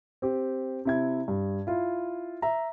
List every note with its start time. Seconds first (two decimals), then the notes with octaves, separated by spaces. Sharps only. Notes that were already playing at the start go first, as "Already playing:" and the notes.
0.22 C4 G4
0.85 C3 E4 G#6
1.28 G2
1.67 E4 F4
2.42 E5 A#5